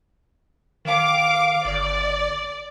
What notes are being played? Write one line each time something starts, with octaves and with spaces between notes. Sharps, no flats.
D#3 F5 D6
G1 D5